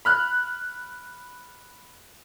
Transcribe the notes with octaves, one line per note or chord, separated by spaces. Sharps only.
B5 F6 F#6